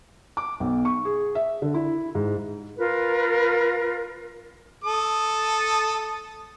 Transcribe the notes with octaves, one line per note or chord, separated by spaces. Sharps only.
D6
B1
C#6
G#4
E5
D3
E4
G#2
F4 A#4 B4
A4 D#6